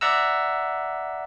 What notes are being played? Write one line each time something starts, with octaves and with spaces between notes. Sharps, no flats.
D5 E5 F#5 A#5 E6